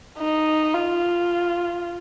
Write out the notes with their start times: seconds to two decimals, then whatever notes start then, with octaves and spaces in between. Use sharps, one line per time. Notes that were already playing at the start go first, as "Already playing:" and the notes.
0.19 D#4
0.74 F4